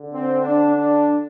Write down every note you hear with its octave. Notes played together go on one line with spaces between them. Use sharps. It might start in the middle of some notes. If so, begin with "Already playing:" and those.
Already playing: D3
C4
D4
D4